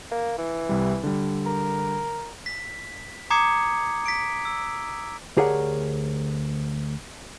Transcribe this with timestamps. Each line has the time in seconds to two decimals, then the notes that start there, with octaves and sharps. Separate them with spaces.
0.12 A#3
0.38 E3
0.69 C2 G3
1.03 D3 G3
1.46 A#4
2.46 B6
3.30 A#5 D6 D#6 G#6 C7 C#7
4.06 B6 D7
4.45 E6
5.37 D2 G4 G#4 A#4 C#5 F#5